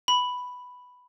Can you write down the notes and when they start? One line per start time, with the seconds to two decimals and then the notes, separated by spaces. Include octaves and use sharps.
0.08 B5